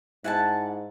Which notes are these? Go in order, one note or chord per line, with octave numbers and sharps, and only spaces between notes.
G#2 E4 F#5 G#5 A5